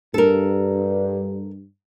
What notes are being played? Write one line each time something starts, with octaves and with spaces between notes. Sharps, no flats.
G2 A4 A#4